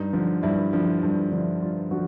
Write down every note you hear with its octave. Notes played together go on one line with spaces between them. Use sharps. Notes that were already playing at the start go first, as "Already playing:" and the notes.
Already playing: G2 D#4
D3 F3
G2 E4
D3 F3
G2
D3 F3
G2 F4
D3 F3 F#4